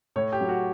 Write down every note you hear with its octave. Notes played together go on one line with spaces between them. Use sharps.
A2 C#5
G4
F#3
F#4